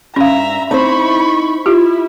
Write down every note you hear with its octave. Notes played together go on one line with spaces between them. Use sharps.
G2 C#4 E5 F5 A#5
C4 D#4 E4 C5 B5 C#6
E4 F4 G4